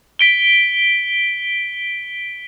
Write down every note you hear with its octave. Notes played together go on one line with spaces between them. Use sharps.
B6 D7 G7